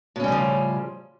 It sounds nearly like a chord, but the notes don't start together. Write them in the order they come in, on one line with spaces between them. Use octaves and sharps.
A2 C#4 G3 C#3 F3